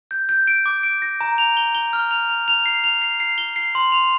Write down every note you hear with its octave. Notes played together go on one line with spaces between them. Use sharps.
G6
G6
D7
D6
D7
A#6
A#5
F7
G7
G7
F6
F7
F7
F7
C7
F7
C7
C7
G7
C7
C6
F7